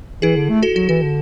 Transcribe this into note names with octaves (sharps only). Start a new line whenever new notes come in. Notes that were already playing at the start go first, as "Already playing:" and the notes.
E3 E4 G#4
D3
A3
F#4 A4
F#3 F#4
E3 F#4
D3